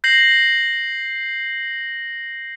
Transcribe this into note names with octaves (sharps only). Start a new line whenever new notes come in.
G6 A#6 C7 F#7